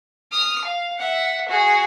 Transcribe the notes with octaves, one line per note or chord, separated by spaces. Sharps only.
D#6 F6
F5
E5 F#5
F#4 G#4